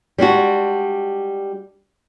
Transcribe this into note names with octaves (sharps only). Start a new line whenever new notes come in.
G3 G#3 D4 F#4